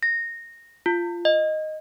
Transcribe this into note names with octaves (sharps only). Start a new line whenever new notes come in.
A#6
F4
D#5